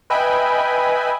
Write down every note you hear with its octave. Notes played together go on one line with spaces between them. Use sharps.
B4 D#5 E5 G5 G#5 B5